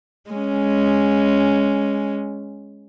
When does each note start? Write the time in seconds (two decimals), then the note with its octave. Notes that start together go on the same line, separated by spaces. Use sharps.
0.31 G#3 C#4